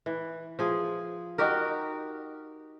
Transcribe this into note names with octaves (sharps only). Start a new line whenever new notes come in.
E3
F3 G#4
D#4 F#4 G4 A#4